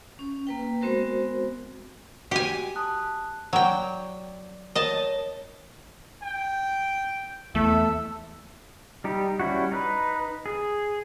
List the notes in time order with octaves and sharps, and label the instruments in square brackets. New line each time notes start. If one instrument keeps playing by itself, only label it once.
[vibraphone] C#4
A#3 B4 G5
G#3 B3 C4 F#4 A#4 C5
[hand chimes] F#4 [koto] G4 G#5
[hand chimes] A5 D#6 F#6
[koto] F#3 G5 [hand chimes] D5 D6
[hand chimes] A#4 C#5 [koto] D#5 A5
[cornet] G5
[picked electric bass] E2 [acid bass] A3 [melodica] A4 [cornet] E5
[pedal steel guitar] G3 D#4 G4
G3 C#4 E4 F#4
D#4 B4
G#4